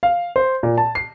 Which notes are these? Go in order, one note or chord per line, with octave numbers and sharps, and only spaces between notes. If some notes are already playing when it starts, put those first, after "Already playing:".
F5
C5
A#2
A5
C7